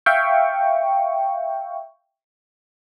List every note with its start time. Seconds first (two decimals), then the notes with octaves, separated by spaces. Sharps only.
0.06 E5 F5 G5 C#6